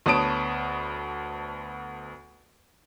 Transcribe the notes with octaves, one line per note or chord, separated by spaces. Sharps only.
D2 B3 C#5 A5 D#6 D7